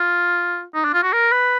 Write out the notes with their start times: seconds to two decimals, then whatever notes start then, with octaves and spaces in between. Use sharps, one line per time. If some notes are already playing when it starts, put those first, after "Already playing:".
Already playing: F4
0.75 D#4
0.85 D4
0.94 F4
1.03 F#4
1.13 A#4
1.32 B4